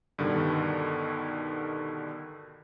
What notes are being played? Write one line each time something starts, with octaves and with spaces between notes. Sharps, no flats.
G2 B2 D3 D#3